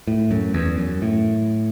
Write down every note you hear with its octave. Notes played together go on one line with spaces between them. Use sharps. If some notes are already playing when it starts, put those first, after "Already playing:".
A2
F#2
E2
F#2
A2